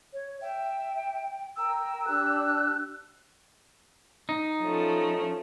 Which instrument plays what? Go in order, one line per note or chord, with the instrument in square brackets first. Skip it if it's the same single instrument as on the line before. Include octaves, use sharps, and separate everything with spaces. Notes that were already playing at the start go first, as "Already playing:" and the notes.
[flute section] C#5
[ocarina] E5 [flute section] G5
[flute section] A#4 G5 A#5 [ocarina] E6
[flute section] D4 G4 F#6
[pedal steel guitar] D#4
[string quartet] F3 A3 C#4